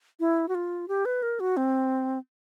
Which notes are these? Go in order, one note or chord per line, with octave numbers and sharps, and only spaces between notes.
E4
F#4
F4
G4
B4
A#4
F#4
C4